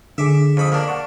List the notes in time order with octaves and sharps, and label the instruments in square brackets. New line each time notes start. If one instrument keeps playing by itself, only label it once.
[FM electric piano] D3 G#4 [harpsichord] E5 D6
[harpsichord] F2 B5 D#6
A#3 D4
[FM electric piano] F#5 A5 C#6